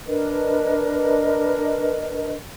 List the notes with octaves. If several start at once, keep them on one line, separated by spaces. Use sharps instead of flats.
D4 A#4 B4 D#5